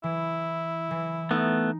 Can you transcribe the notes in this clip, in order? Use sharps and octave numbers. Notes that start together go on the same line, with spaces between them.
E3 E4
E3
A3 B3 D#4